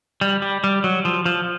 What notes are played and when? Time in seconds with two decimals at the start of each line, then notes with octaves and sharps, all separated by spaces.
0.21 G3
0.42 G3
0.64 G3
0.84 F#3
1.05 F3
1.26 F3